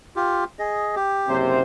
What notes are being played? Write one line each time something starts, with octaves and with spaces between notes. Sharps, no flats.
F4 G4
G#4 D#5
G4
F#1 C3 C5